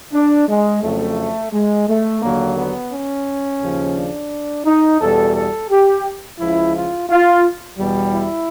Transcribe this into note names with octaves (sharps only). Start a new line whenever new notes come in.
D4
G#3
F2 C#3 F#3 A3
G#3
A3
D#2 D3 F#3 A#3
B3
C#4
D#2 C#3 F3
D4
D#4
E2 B2 G3 A4
A4
G4
C#2 C#3 F3 E4
F4
F4
E2 B2 G3
E4